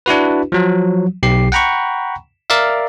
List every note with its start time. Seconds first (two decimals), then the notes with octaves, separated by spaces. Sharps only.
0.06 D4 E4 F#4 B4
0.52 F3 F#3
1.23 B1 G4 C7
1.52 F#5 G5 A#5 B5 C#6
2.50 A#4 D5 E5 F5